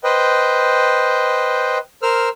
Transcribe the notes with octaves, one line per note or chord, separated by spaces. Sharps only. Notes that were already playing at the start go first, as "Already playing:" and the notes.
B4 C5 D#5 G5
A#4 C5 E6 F6